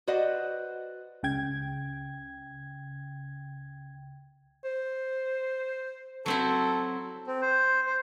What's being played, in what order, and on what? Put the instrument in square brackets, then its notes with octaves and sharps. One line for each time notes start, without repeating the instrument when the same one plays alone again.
[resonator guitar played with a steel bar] F#4 B4 C5 D5 D#5 F#5
[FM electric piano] C#2 C#3 G5 G#6
[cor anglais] C5
[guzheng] F#3 C4 E4 [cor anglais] A4
[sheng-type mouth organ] C4
C5
C5